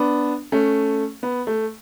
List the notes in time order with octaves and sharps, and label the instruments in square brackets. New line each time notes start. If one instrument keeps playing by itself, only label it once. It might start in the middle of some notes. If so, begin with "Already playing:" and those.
Already playing: [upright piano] B3 D4
A3 C#4
B3
A3